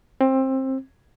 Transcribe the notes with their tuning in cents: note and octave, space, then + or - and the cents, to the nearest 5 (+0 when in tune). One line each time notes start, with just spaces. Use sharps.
C4 +20